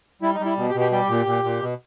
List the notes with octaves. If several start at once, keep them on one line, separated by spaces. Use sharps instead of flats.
G3 E4
D#4
G3
E4
B2
G4
B2
G4
G3 G4
A#2
A#2
A#2
B2